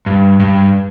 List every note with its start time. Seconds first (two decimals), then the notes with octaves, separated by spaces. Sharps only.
0.06 G2
0.40 G2